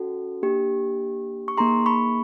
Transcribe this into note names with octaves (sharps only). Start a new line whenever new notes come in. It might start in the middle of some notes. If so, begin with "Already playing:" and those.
Already playing: C#4 F#4 A4
A#3 D4 G4
C#6
A#3 D#4 G#4 A#5 C6
B5 C#6